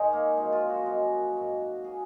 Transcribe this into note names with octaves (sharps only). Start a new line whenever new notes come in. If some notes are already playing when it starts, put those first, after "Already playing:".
Already playing: G#2 D#3 G#3 D#4 G#4 C#5
A#3
F#2 F3 G#3
F4
F#4
F#2 F3 G#3
G#2 F#3
F#3 G#4